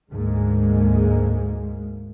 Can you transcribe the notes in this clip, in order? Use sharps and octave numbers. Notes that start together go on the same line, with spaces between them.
D2 G#2 G#3 A#3